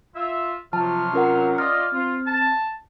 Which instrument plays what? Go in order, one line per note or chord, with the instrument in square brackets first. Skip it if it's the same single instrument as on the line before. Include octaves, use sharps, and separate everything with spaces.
[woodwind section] F4 E5
[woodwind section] C3 F#3 F6 [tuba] F3 [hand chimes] A5
[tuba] C#4 [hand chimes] F4 A#4 F#5
[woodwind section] F4 D5 D#5 [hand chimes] F6
[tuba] C4 [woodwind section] F4
[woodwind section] A5